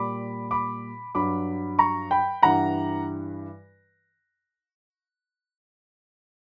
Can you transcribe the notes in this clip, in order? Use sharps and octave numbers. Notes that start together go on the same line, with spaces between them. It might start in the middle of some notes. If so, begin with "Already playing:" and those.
Already playing: A#2 G3 B5 D6
B5 D6
G2 F#3 B5 D6
A#5 C#6
G5 B5
G2 E3 G3 F#5 A#5